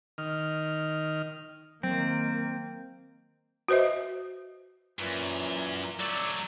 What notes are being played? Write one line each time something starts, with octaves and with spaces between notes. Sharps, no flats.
D#3 F6
D#3 F#3 A#3 C4
F#4 B4 C5 D#5 E5
F#2 A#2 E3
F#3 A3 D5 C#6 E6